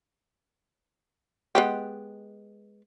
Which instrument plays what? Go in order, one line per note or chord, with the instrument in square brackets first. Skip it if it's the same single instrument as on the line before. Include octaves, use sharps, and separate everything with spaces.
[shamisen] G#3 B3 G4